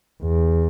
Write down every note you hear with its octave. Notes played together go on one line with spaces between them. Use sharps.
E2